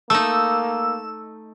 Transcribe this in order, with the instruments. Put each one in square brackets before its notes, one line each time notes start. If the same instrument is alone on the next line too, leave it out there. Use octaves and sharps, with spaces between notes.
[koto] A3 D#4 [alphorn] A#3 [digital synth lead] E6